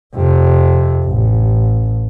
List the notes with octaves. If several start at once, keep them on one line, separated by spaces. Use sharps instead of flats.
F2 C3
A1